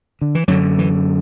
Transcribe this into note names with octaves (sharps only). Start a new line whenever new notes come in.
D3
E3
F#2 D3 F#3
E3